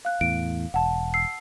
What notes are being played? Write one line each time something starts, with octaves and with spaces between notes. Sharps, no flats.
F5 F#6
E2 A2 D7
E1 F#5 A5
E6 C7